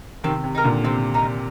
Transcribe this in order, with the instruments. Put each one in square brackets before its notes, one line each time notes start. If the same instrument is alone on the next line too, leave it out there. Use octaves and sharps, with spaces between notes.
[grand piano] C3 D#3 [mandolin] C4
[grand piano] C3
[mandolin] D#4 A#4
[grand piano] A#2 D3
[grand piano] C3 [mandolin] C4
[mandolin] D#4 A#4